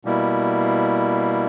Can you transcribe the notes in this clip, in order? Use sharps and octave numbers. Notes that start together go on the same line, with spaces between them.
B2 G3 A#3 E4